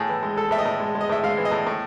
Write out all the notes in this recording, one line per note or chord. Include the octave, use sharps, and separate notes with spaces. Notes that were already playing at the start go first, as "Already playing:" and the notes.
Already playing: A2 G#4
E3
G#3
G#3 A4
A2 E5
D#5
A2
G#3
G#3
D#5
A2 E5
G#3 F5
E3
D#5
A2
A2